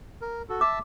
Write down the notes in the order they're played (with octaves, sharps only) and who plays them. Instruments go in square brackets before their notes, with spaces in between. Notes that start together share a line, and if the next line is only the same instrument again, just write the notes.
[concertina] A#4
F#4 A4
[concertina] E5 A5 E6 [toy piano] D6